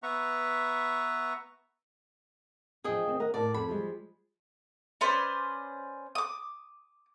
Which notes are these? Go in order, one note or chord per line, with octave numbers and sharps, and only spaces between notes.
B3 B4 E5 A#5 C#6
F3 D4 G#4 D#5 G5
D#3 C4
A#4 D#5 F#5
A2 A#4 D5 A5
F2 A4 B5
F3 G3 G#3
C#4 B4 C5 D5
D6 D#6